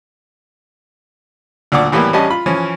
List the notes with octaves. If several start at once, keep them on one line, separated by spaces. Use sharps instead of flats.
D2 A#2 D5 F#5 D6
A2 E3 G3 A#3 B3
A1 G3 C#4 D4 D#5 A5
F4 B5
E3 F3 C#4